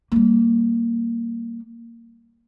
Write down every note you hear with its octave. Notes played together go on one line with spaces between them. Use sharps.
G3 A#3